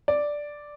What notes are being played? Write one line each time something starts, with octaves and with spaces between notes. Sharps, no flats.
D5